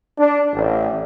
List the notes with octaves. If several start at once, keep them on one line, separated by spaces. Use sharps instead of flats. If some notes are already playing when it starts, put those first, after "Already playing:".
D4
A1